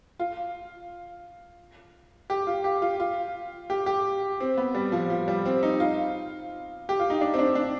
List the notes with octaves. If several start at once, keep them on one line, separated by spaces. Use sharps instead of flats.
F4
G4
F4
G4
F4
F4
G4
G4
C4
B3
G3
F3
F3
G3
C4
D#4
F4
G4
F4
D#4
D4
C4
D4
D4